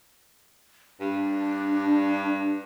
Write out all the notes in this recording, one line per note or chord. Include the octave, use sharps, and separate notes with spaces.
G2 D4